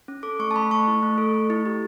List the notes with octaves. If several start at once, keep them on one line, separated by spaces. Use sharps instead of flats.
C#4
A4 D6
A3 C#6
A5
A3 B5
A3 C#6
E4
A3
A4
A3
E4
G4